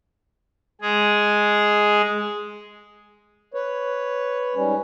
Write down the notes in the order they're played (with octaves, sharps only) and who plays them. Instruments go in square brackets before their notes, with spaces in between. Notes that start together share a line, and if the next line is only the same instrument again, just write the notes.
[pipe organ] G#3 G#4
[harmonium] B4 C#5
G#2 G3 C#4